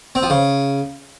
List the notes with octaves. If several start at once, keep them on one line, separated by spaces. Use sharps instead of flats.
C4
F3
C#3